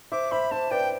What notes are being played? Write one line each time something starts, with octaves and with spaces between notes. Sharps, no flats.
C5 E5 D6
C5 E5 B5
C5 E5 A5
B4 D5 G5